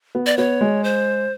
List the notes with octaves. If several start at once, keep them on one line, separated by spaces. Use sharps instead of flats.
B3
D5
B3 C#5
G#3
C5